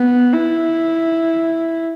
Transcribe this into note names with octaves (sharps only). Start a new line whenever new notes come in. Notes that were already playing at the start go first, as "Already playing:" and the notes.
Already playing: B3
E4